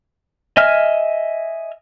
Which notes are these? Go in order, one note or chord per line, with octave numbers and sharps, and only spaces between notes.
D#5 E5 G#5 F6